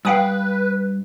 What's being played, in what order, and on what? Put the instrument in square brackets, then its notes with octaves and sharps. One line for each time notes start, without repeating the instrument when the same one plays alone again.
[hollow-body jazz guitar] G2 B5 [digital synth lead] B4 [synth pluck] F5 G5 D#6